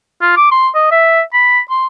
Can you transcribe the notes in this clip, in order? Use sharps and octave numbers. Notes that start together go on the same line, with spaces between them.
F4
D6
C6
D#5
E5
B5
C6